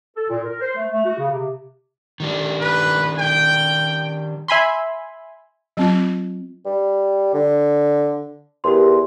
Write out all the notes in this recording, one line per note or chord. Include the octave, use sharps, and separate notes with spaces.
A4
A#2
A#4
C5
A3
A3
F#4
C#3
C3
D#3 G3 D4
B4
G5
E5 G#5 B5 C6
F#3 C4 F4
G3
D3
E2 G4 A#4 C6